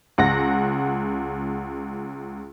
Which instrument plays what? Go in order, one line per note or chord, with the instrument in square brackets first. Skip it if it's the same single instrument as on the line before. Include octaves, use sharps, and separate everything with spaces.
[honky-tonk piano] C#2 F#5 A#6